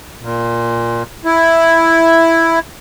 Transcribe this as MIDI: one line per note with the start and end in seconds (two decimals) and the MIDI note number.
0.22 1.03 46
1.25 2.59 64